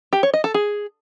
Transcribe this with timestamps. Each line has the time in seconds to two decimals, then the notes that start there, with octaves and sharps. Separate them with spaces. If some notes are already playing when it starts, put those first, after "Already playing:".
0.13 G4
0.23 C#5
0.34 D#5
0.44 A4
0.54 G#4